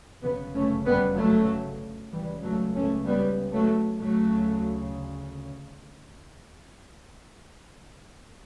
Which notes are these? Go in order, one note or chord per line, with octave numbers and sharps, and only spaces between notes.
G1 F#2 C#3 G3 B3
A3 C#4
G3 B3
F#3 A3
C#2 C#3 E3 G3
F#3 A3
A3 C#4
G3 B3
F#3 A3
D2 C#3 F#3 A3